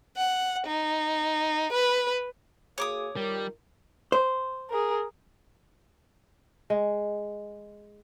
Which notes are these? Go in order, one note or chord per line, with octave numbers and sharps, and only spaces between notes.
F#5
D#4
B4
A#3 F#4 G#4 C#5 D6 D#6
D#3 G3 F4 A#4
C5
G#4 A#4
G#3